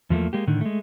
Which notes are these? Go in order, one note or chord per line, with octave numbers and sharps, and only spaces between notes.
E2 F3 A3 A#3
G#3 A#3 G4
A2 D3 D#3
G#3 A3